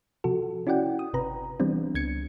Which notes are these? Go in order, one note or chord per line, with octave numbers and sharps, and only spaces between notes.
C3 F3 F#4 A4
C#4 E4 F#4 D5 F#5 G5
D#6
G1 C3 B4 A#5
E3 G3 B3 C4 D4
C#2 G#6 C#7